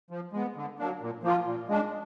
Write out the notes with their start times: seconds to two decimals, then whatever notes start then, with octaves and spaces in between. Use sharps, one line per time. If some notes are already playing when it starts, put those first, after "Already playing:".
0.10 F3
0.33 G#3 B3
0.56 D3
0.79 F#3 A#3 D4
1.01 A#2
1.23 F3 A#3 F4
1.46 A#2
1.69 G#3 D4